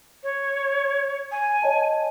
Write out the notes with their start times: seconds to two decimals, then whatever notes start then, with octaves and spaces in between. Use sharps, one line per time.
0.23 C#5
1.32 G#5
1.62 C#5 D#5 A5